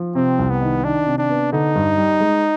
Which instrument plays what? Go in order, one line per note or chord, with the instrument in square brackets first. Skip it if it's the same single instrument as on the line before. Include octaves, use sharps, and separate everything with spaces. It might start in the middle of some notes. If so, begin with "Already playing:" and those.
Already playing: [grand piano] F3
[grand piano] C3 [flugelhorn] C4
[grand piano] C2
[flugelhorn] B3
[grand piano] D#3
[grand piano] D#3 [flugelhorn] D4
[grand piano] C3
[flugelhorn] D4
[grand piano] B3
[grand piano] D3 [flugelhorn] D#4
[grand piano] G2
G3
G#3